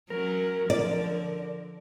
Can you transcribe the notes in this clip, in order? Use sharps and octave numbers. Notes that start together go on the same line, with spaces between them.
F#3 C#4 A#4
D3 F3 D5